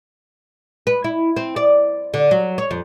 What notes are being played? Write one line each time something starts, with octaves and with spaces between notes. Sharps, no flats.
B4
E4
C4
D5
D3
F#3
C#5
F2